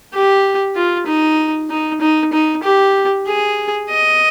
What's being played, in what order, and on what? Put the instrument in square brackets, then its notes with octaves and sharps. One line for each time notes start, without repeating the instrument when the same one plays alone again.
[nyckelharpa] G4
F4
D#4
D#4
D#4
D#4
G4
G#4
D#5